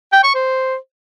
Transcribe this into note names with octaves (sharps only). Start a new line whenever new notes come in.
G5
C#6
C5